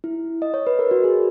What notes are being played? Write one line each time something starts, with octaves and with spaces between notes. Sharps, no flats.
E4
D#5
C#5
B4
A#4
F#4
G#4